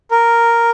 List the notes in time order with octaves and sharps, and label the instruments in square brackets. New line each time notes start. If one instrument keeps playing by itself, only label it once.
[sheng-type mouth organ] A#4